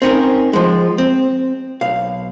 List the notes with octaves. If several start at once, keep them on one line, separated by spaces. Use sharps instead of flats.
C4 C#4 D#4 A#4
F3 G#3
C4
B1 F5